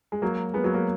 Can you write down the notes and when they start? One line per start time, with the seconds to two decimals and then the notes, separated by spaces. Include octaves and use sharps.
0.12 G#3
0.22 F#3 A#3
0.54 G#3 B3
0.64 F#3 A#3
0.74 F#3 A#3